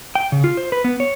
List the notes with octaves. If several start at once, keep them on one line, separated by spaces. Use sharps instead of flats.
G5
C#3
F4
C5
B4
B3
C#5